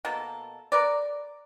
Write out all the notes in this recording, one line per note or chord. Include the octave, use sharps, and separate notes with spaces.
B2 A#3 A4
A#4 B4 D5